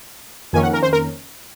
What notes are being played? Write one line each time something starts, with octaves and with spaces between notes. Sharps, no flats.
F2 D#3 A#3 C#4 G#5
F#5
A#4
C5
A#4